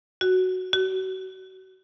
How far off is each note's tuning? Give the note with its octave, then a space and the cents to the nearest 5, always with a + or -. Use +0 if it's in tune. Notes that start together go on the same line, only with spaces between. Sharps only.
F#4 +0
F#4 +30